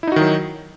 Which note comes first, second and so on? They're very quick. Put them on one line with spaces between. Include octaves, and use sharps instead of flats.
E4 D#4 F#4 D#3 F#3